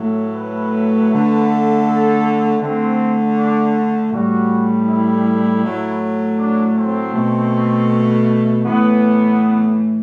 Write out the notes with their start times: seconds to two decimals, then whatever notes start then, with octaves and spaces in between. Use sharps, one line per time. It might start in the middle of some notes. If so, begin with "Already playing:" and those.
Already playing: A2 F#3 A3
0.35 B4
1.11 D3 A3
1.85 A4
2.61 D3 A3 C4
3.37 D4
4.11 A2 G3 F#4
4.88 E4
5.62 A2 F#3 A3
6.38 D4
6.76 C4
7.13 B2 A3
8.63 A2 E3 A3 B3